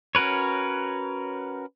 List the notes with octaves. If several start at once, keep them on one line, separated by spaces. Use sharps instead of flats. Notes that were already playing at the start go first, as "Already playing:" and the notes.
C#4 F#4 A#4 B4 C#5